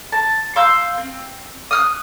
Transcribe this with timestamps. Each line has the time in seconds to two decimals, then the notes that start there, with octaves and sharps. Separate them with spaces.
0.12 A5
0.56 F5 C6 E6 G6
0.98 C4
1.71 D#6 F6 F#6